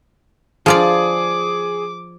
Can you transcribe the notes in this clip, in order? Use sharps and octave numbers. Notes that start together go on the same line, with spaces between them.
F3 F4 G#4 D5 D6